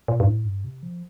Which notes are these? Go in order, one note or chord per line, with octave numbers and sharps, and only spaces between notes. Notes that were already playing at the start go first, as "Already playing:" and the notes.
A#2
G2
A2
G2
C3
F3